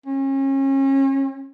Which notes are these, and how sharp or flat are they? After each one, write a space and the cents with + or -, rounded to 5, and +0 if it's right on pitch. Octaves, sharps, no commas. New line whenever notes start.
C#4 -35